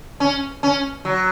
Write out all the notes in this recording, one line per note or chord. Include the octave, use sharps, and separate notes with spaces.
C#4
C#4
F#3